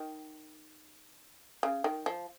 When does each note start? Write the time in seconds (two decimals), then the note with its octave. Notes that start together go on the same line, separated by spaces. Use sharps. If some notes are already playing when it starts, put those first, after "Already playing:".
Already playing: D#3
1.63 C#3
1.84 D#3
2.06 F3